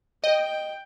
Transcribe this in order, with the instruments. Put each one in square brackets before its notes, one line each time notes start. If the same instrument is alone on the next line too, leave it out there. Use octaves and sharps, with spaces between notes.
[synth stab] D#5 [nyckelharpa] G5